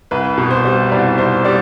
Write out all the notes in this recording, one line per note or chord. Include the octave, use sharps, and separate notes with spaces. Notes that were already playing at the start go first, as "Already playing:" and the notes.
C2 B4
B2
C5
G3
C2 D5
C2 C5
G3 D5